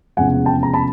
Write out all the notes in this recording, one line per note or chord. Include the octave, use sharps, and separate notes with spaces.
F1 E2 C#3 F3 G#3 F#5 G#5
G5 A5
A#5
A5 B5